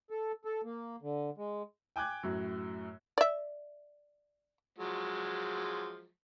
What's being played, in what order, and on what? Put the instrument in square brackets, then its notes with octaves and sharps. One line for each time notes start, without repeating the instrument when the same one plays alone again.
[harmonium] A4
A4
A#3
D3
G#3
[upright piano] G5 G#5 D6 F#6 G#6
F#2 A2 F#3
[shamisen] D5 E5
[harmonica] F3 F#3 G#3